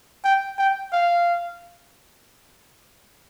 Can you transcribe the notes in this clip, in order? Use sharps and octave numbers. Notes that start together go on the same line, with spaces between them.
G5
G5
F5